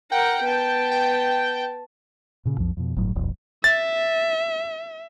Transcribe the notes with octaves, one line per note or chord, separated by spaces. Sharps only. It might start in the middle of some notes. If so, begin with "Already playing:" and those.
A#4 F#5 G5
B3 A5
G5
A#2 C#3
B1 F2 F3
F2 B2
G1 A2 F#3
D#1 B1 F2
E5 A6